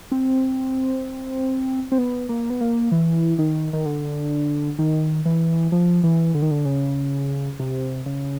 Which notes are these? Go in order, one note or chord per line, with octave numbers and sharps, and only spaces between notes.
C4
C4
B3
A#3
B3
A#3
E3
D#3
D#3
D3
D#3
E3
F3
E3
D3
D#3
D3
C#3
C3
C#3